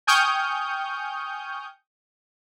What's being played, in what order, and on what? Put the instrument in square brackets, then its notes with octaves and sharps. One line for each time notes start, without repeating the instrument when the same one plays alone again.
[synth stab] G5 G#5 C#6 D#6 F6 G6